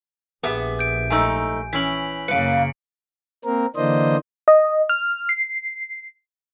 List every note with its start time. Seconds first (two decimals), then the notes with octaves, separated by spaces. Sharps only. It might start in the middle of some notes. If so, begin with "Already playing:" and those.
0.43 A#1 B3 G4 G#4 E5
0.79 G6 D7
1.10 G#2 A3 D#4 G#5
1.73 E3 C#4 B6 F#7
2.28 F#2 C#3 A#3 B4 F5 C#7 D7
3.45 A#3 C4 A#4
3.76 D3 E3 A#3 D4 C5 D#5
4.48 D#5
4.89 F6
5.29 C7